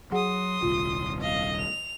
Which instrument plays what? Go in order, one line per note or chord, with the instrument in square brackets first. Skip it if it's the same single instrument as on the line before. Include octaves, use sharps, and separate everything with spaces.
[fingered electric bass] F#3 [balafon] G#4 F#5 [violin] C6 D#6
[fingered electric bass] D#1 C2 [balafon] F4
[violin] D#5 F5
F7